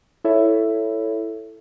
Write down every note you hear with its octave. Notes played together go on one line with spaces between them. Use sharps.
E4 A4 C#5 E5